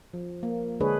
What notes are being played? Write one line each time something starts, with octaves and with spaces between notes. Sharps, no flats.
F3
A#3
D3 G#3 D4 G#4 B4 C#5